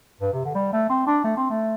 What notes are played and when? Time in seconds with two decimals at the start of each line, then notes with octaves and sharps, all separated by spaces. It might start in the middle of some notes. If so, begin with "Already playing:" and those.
0.21 G2
0.33 C3
0.45 D3
0.55 G3
0.73 A3
0.90 C4
1.07 D4
1.24 A3
1.37 C4
1.50 A3